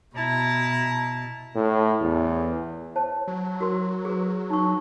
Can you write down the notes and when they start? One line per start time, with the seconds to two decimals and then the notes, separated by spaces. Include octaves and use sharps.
0.16 B2 E4 A5 A#5
1.56 A2
2.01 E2
2.96 C5 C#5 A5
3.28 F#3
3.60 F#4 A#4 C6
4.05 G#4 B4
4.50 D#4 C#6